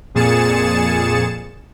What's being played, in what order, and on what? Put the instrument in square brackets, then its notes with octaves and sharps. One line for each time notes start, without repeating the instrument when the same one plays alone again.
[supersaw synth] F2 A#2 G#4 A6 C#7 E7